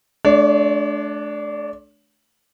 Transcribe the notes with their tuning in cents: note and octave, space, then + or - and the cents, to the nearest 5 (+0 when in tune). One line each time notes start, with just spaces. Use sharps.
A3 -35 D4 +0 C#5 +45